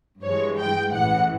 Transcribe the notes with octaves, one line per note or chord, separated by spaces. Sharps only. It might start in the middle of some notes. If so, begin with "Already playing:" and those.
G2 E3 G#3 C#5
G5
A1 A2 E3 F#5